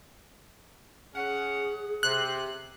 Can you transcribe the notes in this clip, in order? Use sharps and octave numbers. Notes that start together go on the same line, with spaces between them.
C#4 G#4 F#5
C3 F#6